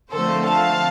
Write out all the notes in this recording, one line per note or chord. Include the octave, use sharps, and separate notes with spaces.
D3 F3 A3 C4 A4 C5
F5 A5